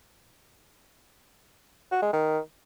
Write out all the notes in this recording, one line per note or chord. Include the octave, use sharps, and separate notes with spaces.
F#4
G#3
D#3